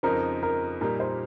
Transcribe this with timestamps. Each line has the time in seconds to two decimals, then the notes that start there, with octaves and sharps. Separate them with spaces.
0.03 F2 C#3 F3 C4 D#4 A#4
0.43 A#4
0.81 A#2 G3 A#3 D#4 G4 A#4
1.00 C5